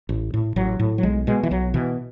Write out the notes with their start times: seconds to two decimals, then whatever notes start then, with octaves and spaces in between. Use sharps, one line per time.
0.09 A1
0.34 A2
0.56 A1 F#3
0.80 A2
0.98 F#3
1.03 B1 G#3
1.27 B2 G#3
1.43 E3
1.51 B1 F#3
1.74 B2 E3